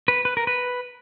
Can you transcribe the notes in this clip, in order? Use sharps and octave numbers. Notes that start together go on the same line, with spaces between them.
B4
B4
A#4
B4